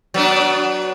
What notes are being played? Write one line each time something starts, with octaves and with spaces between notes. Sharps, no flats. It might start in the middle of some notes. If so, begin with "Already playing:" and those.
F#3 B3 D4